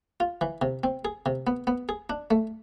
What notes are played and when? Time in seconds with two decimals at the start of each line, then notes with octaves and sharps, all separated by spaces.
0.20 F4
0.41 E3
0.62 C3
0.84 C4
1.05 G#4
1.26 C3
1.47 B3
1.67 B3
1.89 G#4
2.10 D4
2.31 A3